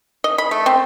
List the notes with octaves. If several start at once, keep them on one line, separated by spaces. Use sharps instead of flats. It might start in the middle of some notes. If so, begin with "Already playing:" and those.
D#5
B5
A3
C4